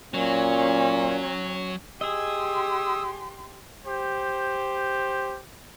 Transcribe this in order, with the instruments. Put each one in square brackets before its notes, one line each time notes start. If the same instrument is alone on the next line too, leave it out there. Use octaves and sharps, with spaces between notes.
[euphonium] A#2 [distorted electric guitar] F#3 [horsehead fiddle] C#4
[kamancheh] G4 C6 [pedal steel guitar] G#4 D#5 [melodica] D#6 E6
[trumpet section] G4 C5